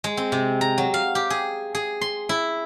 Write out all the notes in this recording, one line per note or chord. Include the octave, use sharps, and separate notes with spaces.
G#3
C4
C3
A#5
F#3
F5
G4
G#4
G#4
C6
E4